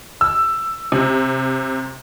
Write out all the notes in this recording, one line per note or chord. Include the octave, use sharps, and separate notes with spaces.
E6
C3